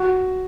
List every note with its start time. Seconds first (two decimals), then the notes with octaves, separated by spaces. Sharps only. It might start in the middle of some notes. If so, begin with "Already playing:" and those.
Already playing: F#4